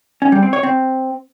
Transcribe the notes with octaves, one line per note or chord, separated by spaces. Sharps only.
C#4
G3
C4
C#5
C4